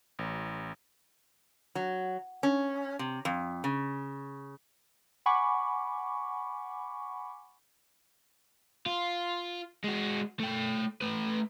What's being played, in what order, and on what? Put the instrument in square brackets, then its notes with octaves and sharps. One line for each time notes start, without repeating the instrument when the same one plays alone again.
[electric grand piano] A1
[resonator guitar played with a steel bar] F#3
C#4
C3
F2
C#3
[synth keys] F#5 G#5 B5 C#6 D6
[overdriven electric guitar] F4
G#3 F#4
A3 G5
A3 B4